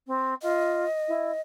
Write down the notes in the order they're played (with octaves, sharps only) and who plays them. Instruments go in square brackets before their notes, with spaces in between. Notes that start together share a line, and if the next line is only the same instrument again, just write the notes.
[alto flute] C4
[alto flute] F4 [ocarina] D#5
[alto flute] E4